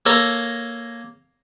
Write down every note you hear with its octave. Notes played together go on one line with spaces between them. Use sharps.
A#3 A4 C#5 A#5